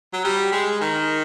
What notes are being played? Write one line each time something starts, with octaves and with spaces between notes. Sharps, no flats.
F#3
G3
G#3
D#3